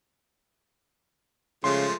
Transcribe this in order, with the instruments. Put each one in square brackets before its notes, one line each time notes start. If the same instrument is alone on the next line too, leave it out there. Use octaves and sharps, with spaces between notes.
[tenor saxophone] C#3 [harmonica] F3 G#3 A3 [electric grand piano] C6